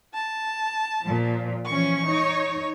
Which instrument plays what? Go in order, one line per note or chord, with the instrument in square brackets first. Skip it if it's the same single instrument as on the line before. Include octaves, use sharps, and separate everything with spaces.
[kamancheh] A5
[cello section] A#2 F3
[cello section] E3 F3 C#4 [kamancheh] C#6
[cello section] D#4 C#5